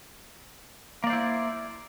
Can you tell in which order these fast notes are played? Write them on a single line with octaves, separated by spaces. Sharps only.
A#3 D5 C5 E4